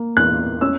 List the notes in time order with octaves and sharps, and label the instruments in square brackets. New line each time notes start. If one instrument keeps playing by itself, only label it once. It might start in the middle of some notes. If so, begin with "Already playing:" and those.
Already playing: [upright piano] A#3
E2 F#6
C#4 E6